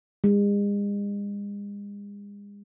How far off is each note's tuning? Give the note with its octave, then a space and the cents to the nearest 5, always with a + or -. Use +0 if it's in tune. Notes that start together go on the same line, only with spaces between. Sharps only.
G#3 -40